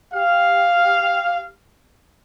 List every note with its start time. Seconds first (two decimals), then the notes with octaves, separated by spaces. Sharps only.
0.13 G4 F5